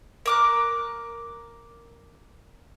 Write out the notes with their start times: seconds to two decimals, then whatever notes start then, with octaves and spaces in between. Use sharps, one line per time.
0.26 A#4 D6 F#6